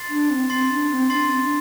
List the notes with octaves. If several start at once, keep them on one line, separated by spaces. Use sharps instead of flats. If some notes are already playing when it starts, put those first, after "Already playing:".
Already playing: C6 A6 C7
D4
C4
C4 C6 A6 C7
D4
C4
D4 C6 A6 C7
C4
D4